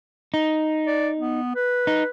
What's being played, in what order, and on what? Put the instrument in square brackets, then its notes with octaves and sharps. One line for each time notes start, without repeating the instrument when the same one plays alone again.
[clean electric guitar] D#4
[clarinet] D5
B3
B4
[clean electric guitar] D#4